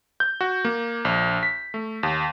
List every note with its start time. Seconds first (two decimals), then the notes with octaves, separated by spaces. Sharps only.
0.20 G6
0.41 F#4
0.65 A#3
1.05 A#1
1.43 B6
1.74 A3
2.03 D#2